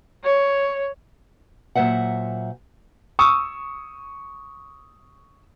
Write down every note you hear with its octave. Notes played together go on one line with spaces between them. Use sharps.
C#5
A#2 F#3 C5 E5 F#5
C#6 D#6 E6